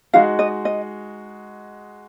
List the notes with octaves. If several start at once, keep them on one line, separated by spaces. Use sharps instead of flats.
G#3 D#4 F#4 F5
D#5
D#5